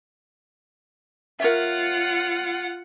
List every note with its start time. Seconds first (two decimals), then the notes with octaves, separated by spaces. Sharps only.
1.40 F4 A#4 C#5 E5 F#5